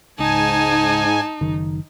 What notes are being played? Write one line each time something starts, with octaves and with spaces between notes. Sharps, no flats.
C#2 G#2 D#4 G#5 A5
F#1 D#3